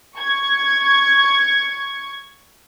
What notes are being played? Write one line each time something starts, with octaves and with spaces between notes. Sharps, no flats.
C#6 G#6